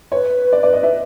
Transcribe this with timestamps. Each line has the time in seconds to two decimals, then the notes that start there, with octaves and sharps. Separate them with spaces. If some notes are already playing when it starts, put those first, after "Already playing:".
0.12 B4 C#5
0.53 D5
0.63 D5
0.73 D#5
0.83 E5